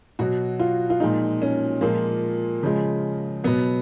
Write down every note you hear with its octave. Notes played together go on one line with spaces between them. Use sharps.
B2 F#3 F#4
F4
F4
A#2 F3 G#3 D#4
C#4
A#2 F3 G#3 A#3
C#3 F3 G#3
B2 F#3 B3